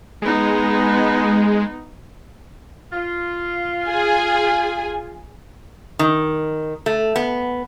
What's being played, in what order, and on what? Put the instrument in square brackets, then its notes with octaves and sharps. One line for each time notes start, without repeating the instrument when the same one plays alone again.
[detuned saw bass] G#3 [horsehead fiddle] B3 D#4
[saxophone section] F4
[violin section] G#4 G#5
[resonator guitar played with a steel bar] D#3
A3
B3